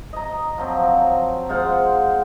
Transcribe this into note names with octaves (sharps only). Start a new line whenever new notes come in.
D#5 A#5
F3 F#3 C4
G#3 F4 C5 F#5